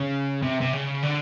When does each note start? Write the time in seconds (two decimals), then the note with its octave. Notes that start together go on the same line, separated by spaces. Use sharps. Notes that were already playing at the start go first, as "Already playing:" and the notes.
Already playing: C#3
0.42 C3
0.61 C3
0.73 C#3
1.03 D3